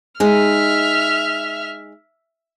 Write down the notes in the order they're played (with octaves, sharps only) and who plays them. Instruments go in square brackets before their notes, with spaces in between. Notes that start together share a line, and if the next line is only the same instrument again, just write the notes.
[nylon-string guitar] G#3 D#4 [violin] E5 F6